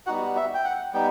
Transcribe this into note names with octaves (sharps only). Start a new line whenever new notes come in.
G3 B3 D#4 F#4 F#5
E5
G5
F#5
G3 B3 D#4 G5